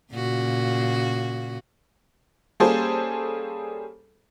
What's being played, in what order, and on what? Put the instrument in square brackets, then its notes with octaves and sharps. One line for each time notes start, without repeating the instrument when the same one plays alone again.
[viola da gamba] A#2 C#3 F#4
[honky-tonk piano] G3 A#3 C#4 G#4 A4 C5